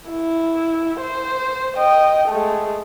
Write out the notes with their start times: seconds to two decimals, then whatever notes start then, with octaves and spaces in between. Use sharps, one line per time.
0.10 E4
1.01 C5
1.77 D#5 G5
2.29 G#3 A3